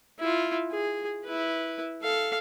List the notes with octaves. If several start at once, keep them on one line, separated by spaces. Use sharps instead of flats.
E4 F4
G#4
E4 B4
A4 F5